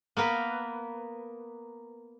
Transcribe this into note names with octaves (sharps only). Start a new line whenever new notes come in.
A#3 B3 A#4 B4